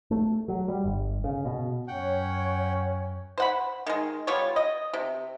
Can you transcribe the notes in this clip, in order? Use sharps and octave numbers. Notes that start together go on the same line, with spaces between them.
A3
F#3
G3
G1
C#3
B2
F#2 C#4 C#5 F#5 G5
C5 F#5 B5
D#3 G#3
G3 B3 F4 C#5
D#5
C3